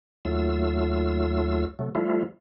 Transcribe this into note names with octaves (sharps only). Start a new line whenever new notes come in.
D#2 F#3 A3 F4 E6
C3 F#3 A3
F3 G3 A3 E4 F4